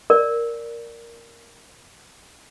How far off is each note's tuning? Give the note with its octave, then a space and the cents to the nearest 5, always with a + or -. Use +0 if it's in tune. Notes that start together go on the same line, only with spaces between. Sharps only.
A#4 +0 D5 +0